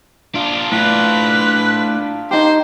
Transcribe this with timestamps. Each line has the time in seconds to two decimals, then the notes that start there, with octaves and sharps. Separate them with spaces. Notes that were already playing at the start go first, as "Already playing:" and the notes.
0.35 D4 F4
0.72 A2 B4
2.31 D#4 G4 C5